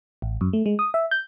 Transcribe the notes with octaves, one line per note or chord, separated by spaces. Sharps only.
A1
F#2
A3
G#3
D#6
E5
G6